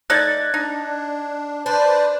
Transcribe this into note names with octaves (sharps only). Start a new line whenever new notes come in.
A3 D#4 D5 F#6 G#6 A6
D4 D#4
D4 B4 C5 D5